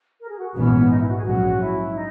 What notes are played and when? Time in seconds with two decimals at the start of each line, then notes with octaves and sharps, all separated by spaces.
0.21 A#4
0.29 G#4
0.38 F#4
0.55 A#1 G#2 E3 B3 C#4
0.90 D#4
0.99 E4
1.07 F#4
1.16 G#4
1.25 A#1 G#2 F#3 C#4 F#4
1.60 E4
1.95 D#4